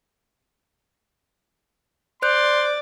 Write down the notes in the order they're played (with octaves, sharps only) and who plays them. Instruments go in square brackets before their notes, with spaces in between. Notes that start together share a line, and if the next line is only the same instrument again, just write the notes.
[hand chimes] C5 F#6 G6 [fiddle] D5 [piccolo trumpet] C6